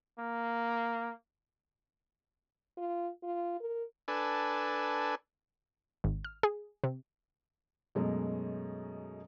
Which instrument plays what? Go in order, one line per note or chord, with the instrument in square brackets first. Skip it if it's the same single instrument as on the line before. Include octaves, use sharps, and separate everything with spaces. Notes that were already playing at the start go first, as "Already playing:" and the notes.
[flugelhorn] A#3
[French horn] F4
F4
A#4
[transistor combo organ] D4 A4 B4 G#5
[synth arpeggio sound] G#1
F6
G#4
C3
[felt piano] F#2 B2 F#3 G#3 A3